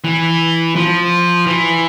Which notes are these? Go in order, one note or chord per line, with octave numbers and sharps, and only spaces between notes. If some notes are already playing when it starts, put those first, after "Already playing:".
E3
F3
E3